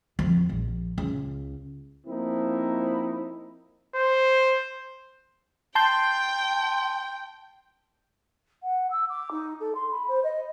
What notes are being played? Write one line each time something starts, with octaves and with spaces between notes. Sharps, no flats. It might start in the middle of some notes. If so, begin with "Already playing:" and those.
F2
A#1
C#2
F3 A#3 C4 D#4 E4
C5
G5 A5 C6 G6
F#5
E6
D6
D#4
A4
C6
B5
C5
D#5